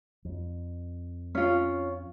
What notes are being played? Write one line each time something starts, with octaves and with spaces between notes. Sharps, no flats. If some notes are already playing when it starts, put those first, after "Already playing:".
F2
C#4 F4